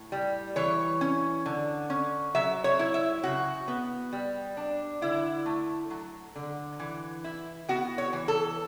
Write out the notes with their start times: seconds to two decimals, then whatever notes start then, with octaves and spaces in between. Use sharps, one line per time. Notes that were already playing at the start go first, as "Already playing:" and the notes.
Already playing: A2
0.12 G3
0.56 E3 C#5
1.01 C#4
1.46 D3
1.90 C#4
2.35 F#3 E5
2.64 C#5
2.79 E4
2.94 E5
3.23 C#3 F#4
3.68 B3
4.13 G3
4.57 D4
5.02 D3 E4
5.46 A3
5.91 F#3
6.36 D3
6.80 E3
7.24 E4
7.69 B3 F#4
7.98 C#5
8.13 E3
8.28 A4